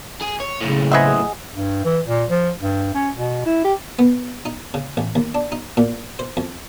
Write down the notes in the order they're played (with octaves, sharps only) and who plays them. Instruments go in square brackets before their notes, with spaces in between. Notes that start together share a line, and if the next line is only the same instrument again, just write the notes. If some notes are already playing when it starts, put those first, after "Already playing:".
[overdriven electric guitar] G#4
C#5
[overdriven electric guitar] B1 A2 [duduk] C#3
[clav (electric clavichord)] G#4 D#5 F#5 [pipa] B4 C5 E5
[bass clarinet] G2
E3
A#2
F3
G2
C#4
B2
E4
G4
[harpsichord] B3
D#4
C#3
A1
D#2
D4
D#4
A#2
C5
F2